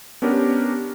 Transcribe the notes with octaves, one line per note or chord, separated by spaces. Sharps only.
B3 C#4 D4 G4 A#4